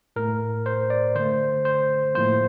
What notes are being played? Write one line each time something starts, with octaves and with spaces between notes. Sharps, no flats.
A2 A3 A#4
C5
D5
D3 A3 C5
C5
A2 F3 A#3 C5